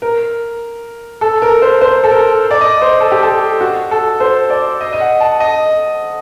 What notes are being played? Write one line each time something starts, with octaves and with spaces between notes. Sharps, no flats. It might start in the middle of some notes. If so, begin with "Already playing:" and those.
A#4
A4
A#4
C5
C5
A4
A#4
D5
D#5
C5
A4
G4
A4
F#4
A4
C5
D5
D#5
D#5
F#5
A5
D#5